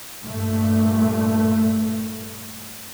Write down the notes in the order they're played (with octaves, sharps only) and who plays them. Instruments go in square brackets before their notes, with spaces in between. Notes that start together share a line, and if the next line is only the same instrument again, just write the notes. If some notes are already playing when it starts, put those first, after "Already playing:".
[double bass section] G2 A#2 A3